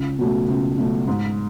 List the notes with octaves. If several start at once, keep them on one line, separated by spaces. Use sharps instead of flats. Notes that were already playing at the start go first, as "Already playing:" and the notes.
Already playing: C#2
B2 F#3 A3
C#2
B2 F#3 A3
G#2